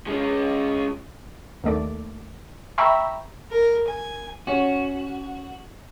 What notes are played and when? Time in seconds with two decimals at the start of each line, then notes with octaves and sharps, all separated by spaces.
0.07 G#3 C#4
1.64 D#2 A3 D5
2.78 E5 G5 A#5 B5 C#6 E6
3.51 A#4
3.88 G#5
4.47 C#4 F#4